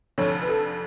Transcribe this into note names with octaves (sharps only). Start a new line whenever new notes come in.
F1 F2 D3 C#5
B4
A4